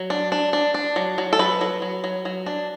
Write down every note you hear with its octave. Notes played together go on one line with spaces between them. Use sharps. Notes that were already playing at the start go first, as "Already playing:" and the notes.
Already playing: F#3
D4
D4
D4
D4
F#3
F#3
A4
F#3 B4
F#3
F#3
F#3
F#3
D4